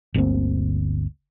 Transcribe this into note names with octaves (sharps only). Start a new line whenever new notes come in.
G1 D2 A#3 C4